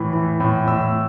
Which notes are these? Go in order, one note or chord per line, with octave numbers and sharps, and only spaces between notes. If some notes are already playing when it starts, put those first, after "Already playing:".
Already playing: A2 E3
E3
A2
A2 E6